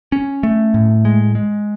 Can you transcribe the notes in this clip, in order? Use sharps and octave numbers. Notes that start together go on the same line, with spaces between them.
C#4
A3
A2
G#3
G#3